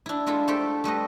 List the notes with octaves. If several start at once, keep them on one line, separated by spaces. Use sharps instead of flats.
D4 E4
G#3 D4 E4 F4 A4
A3 G4 A4 C5 G5
G3 A3 B4 D#5